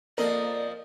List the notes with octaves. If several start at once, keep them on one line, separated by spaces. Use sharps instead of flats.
F2 F3 A#3 A4 A#4 D5 D#5